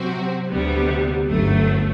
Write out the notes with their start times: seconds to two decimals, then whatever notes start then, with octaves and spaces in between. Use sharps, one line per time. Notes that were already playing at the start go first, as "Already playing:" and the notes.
Already playing: C3 F#3 C4 F#4
0.48 D2 C3 G3 B3
1.27 G1 F#2 F#3 A3